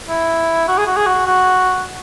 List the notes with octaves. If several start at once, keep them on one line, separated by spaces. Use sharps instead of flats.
E4
F#4
G#4
F#4
G#4
F#4
F#4